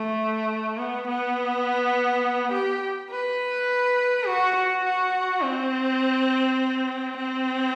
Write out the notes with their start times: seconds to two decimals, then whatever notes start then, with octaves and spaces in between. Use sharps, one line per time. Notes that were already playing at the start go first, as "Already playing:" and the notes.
Already playing: A3
0.78 B3
1.07 B3
2.52 G4
3.10 B4
4.26 F#4
4.55 F#4
4.84 F#4
5.42 C4
7.17 C4